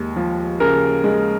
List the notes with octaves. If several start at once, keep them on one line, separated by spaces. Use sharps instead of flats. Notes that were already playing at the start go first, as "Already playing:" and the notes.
Already playing: D#2 G#3
F3
C#3 A#4
G#3